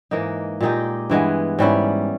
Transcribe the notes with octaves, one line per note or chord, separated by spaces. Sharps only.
G#2 E3 A#3 D#4
A#2 G#3 D#4 G4
G2 E3 G#3 B3
G#2 G3 C#4 E4